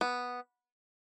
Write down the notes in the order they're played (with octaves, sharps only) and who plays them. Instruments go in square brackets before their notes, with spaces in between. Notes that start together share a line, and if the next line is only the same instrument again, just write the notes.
[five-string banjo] B3